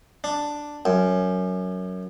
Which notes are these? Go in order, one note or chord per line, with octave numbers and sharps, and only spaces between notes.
D4
F#2